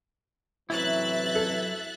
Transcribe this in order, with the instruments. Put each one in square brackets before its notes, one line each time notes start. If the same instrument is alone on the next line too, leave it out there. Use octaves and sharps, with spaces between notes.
[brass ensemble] A1 C3 E3 [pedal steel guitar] F#3 E4 [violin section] E5 F#6 A6
[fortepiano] A4